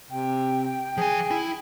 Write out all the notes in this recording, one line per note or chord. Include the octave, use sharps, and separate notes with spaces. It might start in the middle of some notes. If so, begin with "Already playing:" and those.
C3 G5
F3 G#4 G#5
E4